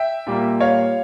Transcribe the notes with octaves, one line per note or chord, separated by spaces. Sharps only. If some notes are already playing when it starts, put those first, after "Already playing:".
Already playing: E5 G5
A#2 G3 A#3
C#5 F5